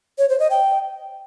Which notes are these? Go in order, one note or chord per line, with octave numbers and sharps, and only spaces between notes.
C#5
C5
D#5
G5